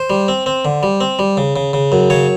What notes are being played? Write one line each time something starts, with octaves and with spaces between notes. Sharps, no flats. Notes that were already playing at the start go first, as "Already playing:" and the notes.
Already playing: C5
G3
C4
C4
D3
G3
C4
G3
C#3
C#3
C#3
F#2
C#3 C#5